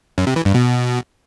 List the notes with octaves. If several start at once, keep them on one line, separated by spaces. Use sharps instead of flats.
F#2
C3
E3
G2
B2